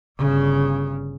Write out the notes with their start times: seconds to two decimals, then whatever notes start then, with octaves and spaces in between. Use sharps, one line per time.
0.18 G1 C#3